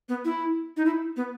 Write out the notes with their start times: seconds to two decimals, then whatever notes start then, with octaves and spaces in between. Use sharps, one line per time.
0.09 B3
0.25 E4
0.77 D#4
0.85 E4
1.17 B3